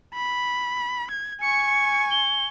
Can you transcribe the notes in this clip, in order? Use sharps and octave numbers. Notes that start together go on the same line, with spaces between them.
B5
G#6
G#5 C#6 C#7
G7